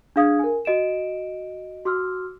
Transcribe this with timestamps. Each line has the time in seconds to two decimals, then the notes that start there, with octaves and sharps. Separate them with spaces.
0.16 D4 G#4 F5 D#6 G#6
0.39 A#4 G#5
0.65 F#4 D#5 D7 E7
1.85 F#4 C6 D6 E6 F6